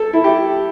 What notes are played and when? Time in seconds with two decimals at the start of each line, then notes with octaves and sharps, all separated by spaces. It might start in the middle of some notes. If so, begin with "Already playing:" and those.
Already playing: A4
0.13 E4
0.24 G4